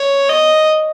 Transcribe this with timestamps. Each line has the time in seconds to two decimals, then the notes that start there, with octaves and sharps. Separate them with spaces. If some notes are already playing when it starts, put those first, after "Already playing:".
Already playing: C#5
0.29 D#5